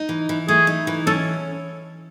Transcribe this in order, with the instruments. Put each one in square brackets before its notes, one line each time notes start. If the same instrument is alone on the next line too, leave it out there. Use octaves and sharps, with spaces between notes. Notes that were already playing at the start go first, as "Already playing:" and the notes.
Already playing: [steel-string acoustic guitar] D#4
E3
E3
[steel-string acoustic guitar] A3 [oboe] G#4
[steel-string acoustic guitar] D#4
E3
[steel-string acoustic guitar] C#4 [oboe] A4